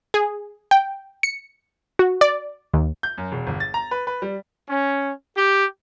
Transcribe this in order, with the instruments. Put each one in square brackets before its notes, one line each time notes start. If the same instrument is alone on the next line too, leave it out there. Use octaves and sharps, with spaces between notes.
[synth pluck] G#4
G5
C#7
F#4
D5
D#2
[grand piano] G6
F#2
E1
G1
A6
A#5
B4
B4
G3
[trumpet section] C#4
G4